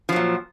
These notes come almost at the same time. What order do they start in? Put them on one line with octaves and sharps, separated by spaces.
F3 F#3 A#2